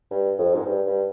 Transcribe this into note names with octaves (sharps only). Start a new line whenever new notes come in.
G2
F2
G#2
G2
G2